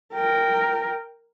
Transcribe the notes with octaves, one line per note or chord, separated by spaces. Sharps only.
A#4 G5